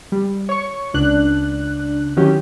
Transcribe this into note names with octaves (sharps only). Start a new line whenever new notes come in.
G3
C#5 C#6
C#2 D4 F#6
D#3 F#3 C#4 E4 G4